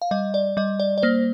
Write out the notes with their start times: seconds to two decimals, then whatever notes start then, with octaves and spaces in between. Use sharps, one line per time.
0.02 F5
0.11 G3 D#5
0.34 D5
0.57 G3 D#5
0.80 D5
0.98 D5
1.02 A#3 C5